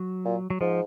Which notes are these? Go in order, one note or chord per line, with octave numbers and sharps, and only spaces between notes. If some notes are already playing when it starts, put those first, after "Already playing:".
Already playing: F#3
A#2
F#3
G#2 F3